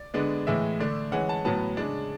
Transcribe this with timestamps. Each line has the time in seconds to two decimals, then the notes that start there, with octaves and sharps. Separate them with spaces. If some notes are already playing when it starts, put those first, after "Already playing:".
Already playing: D5
0.14 D3 G#3 B3 D4
0.47 A2 E3 G#3 E5
0.80 D3 A3 D4
1.12 E3 G#3 C#4 F#5
1.29 A5
1.45 A2 F#3 B3 A5
1.77 C#3 G#3 D4